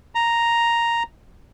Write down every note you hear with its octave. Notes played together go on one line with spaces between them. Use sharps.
A#5